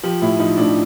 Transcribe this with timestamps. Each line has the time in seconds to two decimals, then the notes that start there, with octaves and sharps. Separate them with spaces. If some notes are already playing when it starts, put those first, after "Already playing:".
0.03 F3 G4
0.22 A2 E4
0.39 F3 D#4
0.57 A2 D4